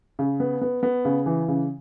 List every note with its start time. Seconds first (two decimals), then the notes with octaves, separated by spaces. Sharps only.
0.19 C#3
0.40 B3
0.61 B3
0.83 B3
1.05 C#3
1.26 E3
1.48 C#3